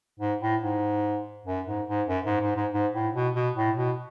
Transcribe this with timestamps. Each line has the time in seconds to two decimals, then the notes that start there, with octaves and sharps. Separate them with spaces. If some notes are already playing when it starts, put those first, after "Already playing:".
0.19 G#2
0.41 A2
0.62 G#2
1.46 F#2
1.67 G#2
1.88 G#2
2.08 F#2
2.25 G#2
2.41 G#2
2.56 G#2
2.73 G#2
2.94 A2
3.14 B2
3.35 B2
3.56 A2
3.77 B2